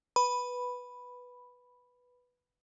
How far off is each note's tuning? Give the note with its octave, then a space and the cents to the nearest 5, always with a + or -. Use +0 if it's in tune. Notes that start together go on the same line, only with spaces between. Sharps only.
B4 +0 B5 +0